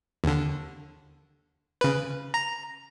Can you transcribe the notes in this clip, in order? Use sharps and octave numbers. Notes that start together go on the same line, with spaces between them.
D#2 D3
C#3 B4
A#5